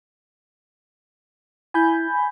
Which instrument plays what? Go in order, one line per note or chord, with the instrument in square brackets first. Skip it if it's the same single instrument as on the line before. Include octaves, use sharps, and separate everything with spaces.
[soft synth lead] E4 [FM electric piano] G#5 B5 G6